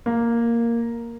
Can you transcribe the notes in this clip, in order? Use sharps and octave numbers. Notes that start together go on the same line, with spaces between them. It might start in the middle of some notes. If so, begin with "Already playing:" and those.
A#3